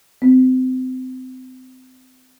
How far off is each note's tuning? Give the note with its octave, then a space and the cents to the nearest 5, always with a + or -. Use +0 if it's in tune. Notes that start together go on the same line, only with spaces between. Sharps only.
C4 -30